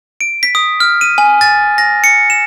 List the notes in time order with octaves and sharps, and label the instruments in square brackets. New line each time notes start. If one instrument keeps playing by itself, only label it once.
[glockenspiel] D7
B6
D#6
F6
D#7
G#5
A6
A#6
C#7
E7